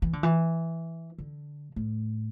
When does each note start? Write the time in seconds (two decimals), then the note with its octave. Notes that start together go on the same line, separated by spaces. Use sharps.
0.02 E3
0.13 D3
0.23 E3
1.18 D3
1.76 A2